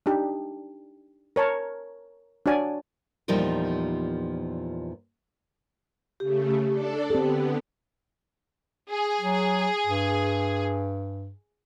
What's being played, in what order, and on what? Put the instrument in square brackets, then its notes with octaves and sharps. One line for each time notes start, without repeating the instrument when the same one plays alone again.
[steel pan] D4 D#4 G4
A#4 C#5 A5
D4 F#4 C#5 D5 G#5
[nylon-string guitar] E2 A#2 F3 G3 D#4 A#4
[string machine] C#3 A3 [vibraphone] G4
[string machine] D4 A4 D5
[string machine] D3 B3 [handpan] C4 A4 [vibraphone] G4
[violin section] G#4
[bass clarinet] F#3
G2